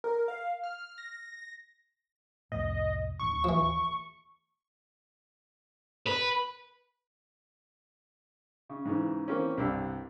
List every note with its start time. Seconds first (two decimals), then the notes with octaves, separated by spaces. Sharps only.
0.04 A#4
0.28 F5
0.64 F6
0.98 A#6
2.52 C2 F2 A2 D#5
3.19 D1 A1 D#2 C#6
3.44 E3 F3
6.07 B4
8.69 C#3
8.85 G#2 C#3 E3
9.28 E3 A#3 C4 C#4
9.58 C2 G2 G4 F5 E6